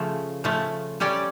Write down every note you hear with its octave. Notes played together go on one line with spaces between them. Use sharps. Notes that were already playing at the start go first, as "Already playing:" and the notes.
Already playing: C#3 F3 A3
C#3 F3 A3
G3 C#4 G4 D5